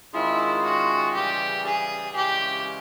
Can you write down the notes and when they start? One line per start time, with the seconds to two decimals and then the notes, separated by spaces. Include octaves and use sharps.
0.13 D#3 G#3 C#4 E4 F4 G#4
0.65 F#4
1.14 C#3 E3 G3 G4
1.66 G#4
2.15 C#3 E3 G#3 C#4 G4